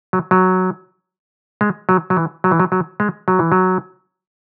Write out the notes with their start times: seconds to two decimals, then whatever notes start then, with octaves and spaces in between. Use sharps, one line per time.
0.13 F#3
0.31 F#3
1.61 G#3
1.89 F#3
2.10 F#3
2.17 E3
2.44 F#3
2.51 E3
2.60 F#3
2.72 F#3
3.00 G#3
3.28 F#3
3.39 E3
3.52 F#3